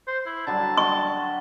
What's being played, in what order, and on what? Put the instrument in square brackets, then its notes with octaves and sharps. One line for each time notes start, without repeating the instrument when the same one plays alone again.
[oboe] C5
E4
[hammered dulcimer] D3 F#3 G3 [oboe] A5
[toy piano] C#6